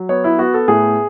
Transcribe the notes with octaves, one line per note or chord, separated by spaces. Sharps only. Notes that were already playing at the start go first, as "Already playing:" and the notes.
Already playing: F#3
B3 C#5
E4
B3 F#4
A4
A2 G#4